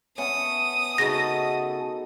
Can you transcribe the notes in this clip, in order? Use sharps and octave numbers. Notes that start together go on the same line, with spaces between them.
B3 C#4 E5 A5 D#6
C#3 A3 D#4 F#4 G#4 A4 A#6